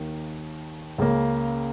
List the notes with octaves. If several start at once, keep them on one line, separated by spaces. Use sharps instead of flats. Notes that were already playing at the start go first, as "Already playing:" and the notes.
Already playing: D#2 D#3 A#3
C#2 C#3 A#3